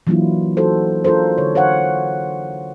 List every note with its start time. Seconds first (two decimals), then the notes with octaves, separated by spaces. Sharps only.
0.07 E3 F#3 A#3 D4 E4 F4
0.57 D#4 F#4 A4 C5
1.04 D4 F4 A4 A#4 C5
1.38 D3 C#5
1.55 C5 C#5 F5 F#5